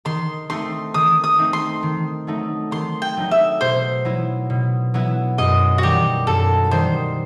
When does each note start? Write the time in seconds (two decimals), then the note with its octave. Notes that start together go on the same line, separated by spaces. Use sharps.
0.05 D#3 C6
0.50 A3 C4 D#4 C6
0.94 D#3 D#6
1.24 D#6
1.38 A3 C4 D#4
1.53 C6
1.83 D#3
2.27 F#3 A3 D#4
2.71 D#3 C6
3.02 G5
3.17 F#3 A3 D#4
3.31 E5
3.61 B2 C5
4.05 F#3 B3 E4
4.50 B2
4.94 F#3 B3 E4
5.38 F#2 D#5
5.78 F#4
5.83 D#3 G3 G4
6.27 F#2 A4
6.71 D#3 G3 C5